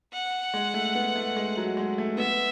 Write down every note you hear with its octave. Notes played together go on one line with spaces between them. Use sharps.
F#5
G#3
A3
B3
A3
G#3
F#3
G#3
A3
B3 E5